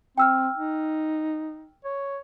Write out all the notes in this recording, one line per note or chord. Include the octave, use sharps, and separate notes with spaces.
C4 G5 E6 F6
D#4
C#5